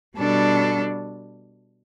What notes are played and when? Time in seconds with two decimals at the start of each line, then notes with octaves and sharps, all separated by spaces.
0.17 B2 G3 D4 A4